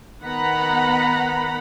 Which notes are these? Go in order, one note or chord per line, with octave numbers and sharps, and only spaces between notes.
D#3 B3 F#5 A#5 B5